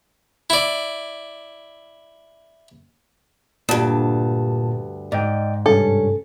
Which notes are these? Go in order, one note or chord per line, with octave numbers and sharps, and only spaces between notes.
E4 D5
D2 G2 A#2 A5
G#2 D5 D#5 G5
G2 C3 C#4 A4